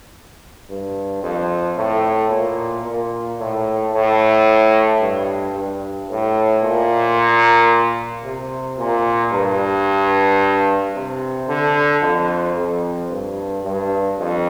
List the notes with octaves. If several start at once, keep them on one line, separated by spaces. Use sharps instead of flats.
G2
F2
A2
A#2
A#2
A2
A2
G2
G2
A2
A#2
C3
A#2
G2
C3
D3
F2
F2
G2
G2
F2